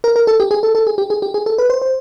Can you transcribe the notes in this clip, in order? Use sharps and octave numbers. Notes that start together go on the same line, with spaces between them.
A#4
A#4
A4
G4
G#4
A4
A4
G#4
G4
G#4
G4
G#4
A4
B4
C5
C5